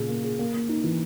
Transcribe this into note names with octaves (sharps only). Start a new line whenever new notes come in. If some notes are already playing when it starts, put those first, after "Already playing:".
Already playing: A#2 C#3 G#4
A#3
G#4
A#3
A#3
D#4
E3